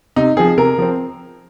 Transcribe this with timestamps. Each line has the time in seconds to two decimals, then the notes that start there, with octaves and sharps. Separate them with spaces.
0.16 C3 D#4
0.37 F3 C4 G#4
0.58 C3 A#4
0.78 F3 C4